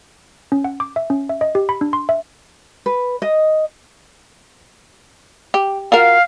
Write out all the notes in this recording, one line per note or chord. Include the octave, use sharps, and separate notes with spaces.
C#4
F#5
D6
E5
C#4
E5
D#5
G4
B5
D4
C6
E5
B4
D#5
G4
F4 F#4 A#4 F5